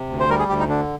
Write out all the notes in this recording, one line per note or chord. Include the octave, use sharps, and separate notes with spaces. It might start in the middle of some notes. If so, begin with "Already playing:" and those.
Already playing: C3
D2
C5
G3 A#4
G#4
D2 G4
D#4
D3 D4